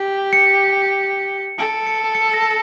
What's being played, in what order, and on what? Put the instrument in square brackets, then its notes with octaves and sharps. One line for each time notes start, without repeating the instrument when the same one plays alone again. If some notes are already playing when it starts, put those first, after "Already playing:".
Already playing: [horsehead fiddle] G4
[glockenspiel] C#7
[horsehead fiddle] A4 [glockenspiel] D7
[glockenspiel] C#7
C#7
A#6
C#7